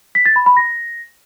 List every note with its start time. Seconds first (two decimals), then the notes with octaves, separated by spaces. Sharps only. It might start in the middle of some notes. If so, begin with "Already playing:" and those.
0.15 B6
0.25 A6
0.36 B5
0.46 B5
0.57 A#6